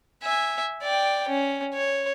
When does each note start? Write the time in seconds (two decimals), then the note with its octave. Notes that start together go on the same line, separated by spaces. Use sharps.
0.23 E5 G#5
0.82 D5 G5
1.28 C#4
1.74 C#5